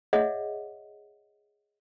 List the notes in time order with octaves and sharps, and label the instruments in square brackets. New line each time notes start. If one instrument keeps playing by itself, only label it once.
[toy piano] G#4 C#5 D#5 E5 F#5